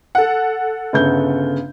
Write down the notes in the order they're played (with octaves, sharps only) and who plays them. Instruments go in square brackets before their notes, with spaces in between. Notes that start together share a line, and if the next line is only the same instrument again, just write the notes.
[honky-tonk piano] A4 F#5
[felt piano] G1 C#3 G6